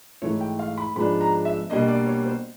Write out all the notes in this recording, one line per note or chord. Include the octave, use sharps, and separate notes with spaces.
G#2 E3 A3 C#5
G5
F5
B5
G#2 F3 G#3 B3 D4 B5
A#5
E5
B2 G3 A#3 D4 D#5
D5
C#5
C5